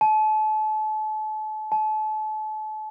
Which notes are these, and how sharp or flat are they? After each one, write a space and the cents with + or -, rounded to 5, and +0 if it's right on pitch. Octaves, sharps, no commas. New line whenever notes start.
A5 -35
A5 -35